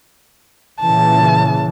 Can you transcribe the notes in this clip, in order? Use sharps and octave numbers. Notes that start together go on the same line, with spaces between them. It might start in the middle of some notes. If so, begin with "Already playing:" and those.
A#2 C#3 E3 A5